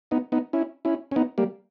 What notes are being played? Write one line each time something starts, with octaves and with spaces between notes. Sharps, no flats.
B3 D#4
B3 D#4
C#4 E4
C#4 E4
C#4
B3 D#4
G3 A#3